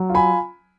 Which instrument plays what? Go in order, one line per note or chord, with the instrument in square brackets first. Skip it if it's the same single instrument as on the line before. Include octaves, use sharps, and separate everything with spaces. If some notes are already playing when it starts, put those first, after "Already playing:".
Already playing: [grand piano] F#3
F4
G#5 B5